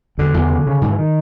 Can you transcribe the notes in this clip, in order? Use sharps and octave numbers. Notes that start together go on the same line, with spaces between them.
E2 D3
E2
C#3
C#3
G#2 D#3
E3
D#3